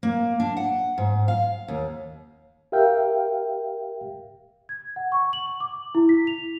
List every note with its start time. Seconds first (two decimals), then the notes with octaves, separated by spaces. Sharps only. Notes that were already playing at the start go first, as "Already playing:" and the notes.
0.03 A#3
0.40 D4
0.57 F#5
0.98 G#2
1.28 F5
1.68 D#2
2.72 G4 A#4 E5 F5 G5
4.69 G#6
4.96 F#5
5.12 C#6
5.33 F#7
5.60 D6
5.95 E4
6.09 B6
6.27 F7